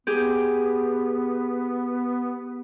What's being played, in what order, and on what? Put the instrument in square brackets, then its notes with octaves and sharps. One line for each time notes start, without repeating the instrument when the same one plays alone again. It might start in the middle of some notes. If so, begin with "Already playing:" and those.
[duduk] B3 [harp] G4 G#4